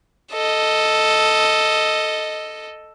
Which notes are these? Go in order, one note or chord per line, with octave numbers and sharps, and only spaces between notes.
A4 D#5